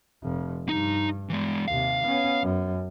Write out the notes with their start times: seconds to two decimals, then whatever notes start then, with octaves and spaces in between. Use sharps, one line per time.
0.22 F1 F2
0.69 G2 D#4
1.29 E3 G#3
1.68 D#2 C3 F5
2.04 B3 C#4
2.43 F#2